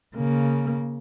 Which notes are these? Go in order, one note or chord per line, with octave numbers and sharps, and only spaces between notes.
C#3 A#3